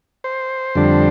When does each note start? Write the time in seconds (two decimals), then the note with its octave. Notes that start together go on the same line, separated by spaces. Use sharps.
0.24 C5
0.75 F2 D3 G3 D4